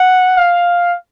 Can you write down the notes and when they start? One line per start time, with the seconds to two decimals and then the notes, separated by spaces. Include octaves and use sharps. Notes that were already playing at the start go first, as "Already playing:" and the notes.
Already playing: F#5
0.37 F5